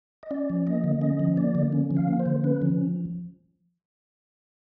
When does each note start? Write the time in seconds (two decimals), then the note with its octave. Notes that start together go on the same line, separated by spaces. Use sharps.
0.23 D#5
0.31 C#4 D5
0.50 F3
0.67 A#3 D#5
0.84 D3
1.01 C#4 D#5
1.19 F3
1.37 A#3 D5
1.55 D3
1.72 C#4
1.91 F3
1.97 F5
2.08 A#3
2.19 C5
2.26 D3
2.44 C#4 B4
2.62 F3